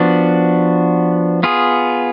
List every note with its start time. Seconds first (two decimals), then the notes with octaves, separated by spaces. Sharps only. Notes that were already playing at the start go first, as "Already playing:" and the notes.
Already playing: F3 B3 D4 F#4
1.43 B3 F4 G#4